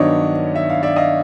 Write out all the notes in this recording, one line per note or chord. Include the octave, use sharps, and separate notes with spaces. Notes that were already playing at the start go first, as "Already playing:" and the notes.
Already playing: G2 D#3 F#3 B3 D4 C#5 D#5
E5
F5
D5 E5
D#5 F5